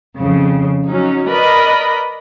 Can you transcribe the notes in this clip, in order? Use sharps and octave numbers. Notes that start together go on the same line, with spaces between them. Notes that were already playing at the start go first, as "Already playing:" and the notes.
F2 C#3
F#3 C#4 D#4
A#4 B4 D5 D#5 B5